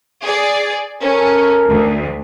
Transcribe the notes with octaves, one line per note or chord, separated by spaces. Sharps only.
G#4 D5
C#4 A4 A#4
D2